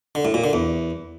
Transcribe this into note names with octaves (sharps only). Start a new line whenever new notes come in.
D3
A2
A#2
D3
E2